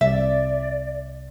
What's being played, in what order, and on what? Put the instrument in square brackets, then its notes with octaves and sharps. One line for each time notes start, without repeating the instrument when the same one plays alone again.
[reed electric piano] C2 [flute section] D5 [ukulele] E5